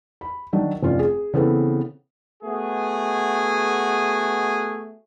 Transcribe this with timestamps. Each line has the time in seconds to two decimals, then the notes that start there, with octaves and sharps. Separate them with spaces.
0.21 B5
0.53 D#3 F#3 D4
0.83 F1 C#4 F4 D5
0.99 G#4
1.34 C#3 E3 B3 C4 A4 B4
2.44 A3 B3 F#4 G#4